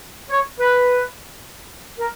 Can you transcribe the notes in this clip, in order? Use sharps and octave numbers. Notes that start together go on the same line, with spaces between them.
C#5
B4
A#4